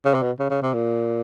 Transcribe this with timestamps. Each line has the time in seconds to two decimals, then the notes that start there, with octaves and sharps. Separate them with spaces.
0.05 C#3
0.14 C3
0.22 B2
0.39 C#3
0.50 C#3
0.62 C3
0.74 A#2